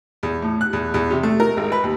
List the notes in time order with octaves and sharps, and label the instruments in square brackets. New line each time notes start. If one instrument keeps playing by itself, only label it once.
[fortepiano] E2
A2
F#6
E2
E2
C3
A3
A#4
G#1
B4
D#2